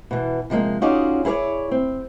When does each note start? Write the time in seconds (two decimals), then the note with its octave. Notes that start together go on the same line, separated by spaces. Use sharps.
0.11 B2 E3
0.50 C3 F3 G#3 A#3
0.82 C#4 D#4 F4 F#4 G#4 D5
1.25 E4 G#4 A#4 C#5 D5
1.71 C4